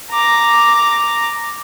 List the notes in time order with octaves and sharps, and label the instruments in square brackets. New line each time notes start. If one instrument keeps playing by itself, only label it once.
[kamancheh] A#5 D6